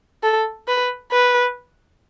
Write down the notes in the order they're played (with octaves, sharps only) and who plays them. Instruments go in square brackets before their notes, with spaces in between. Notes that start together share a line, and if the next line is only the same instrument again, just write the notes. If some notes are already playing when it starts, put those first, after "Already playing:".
[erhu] A4
B4
B4